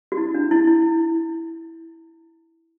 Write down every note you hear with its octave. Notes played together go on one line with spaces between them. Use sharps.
F#4
E4
D4
E4
E4